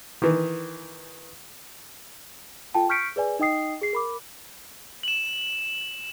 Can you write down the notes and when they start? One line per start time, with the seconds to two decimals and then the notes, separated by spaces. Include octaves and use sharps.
0.22 D#3 E3
2.74 F4 A4 G5 A5
2.89 C#6 F6 G6 B6 C#7 D7
3.16 G#4 B4 D5 G#5
3.39 D#4 D#5 G5 D#6 C7
3.81 G#4 C7
3.93 A#4 B5 D6
5.03 E7 F#7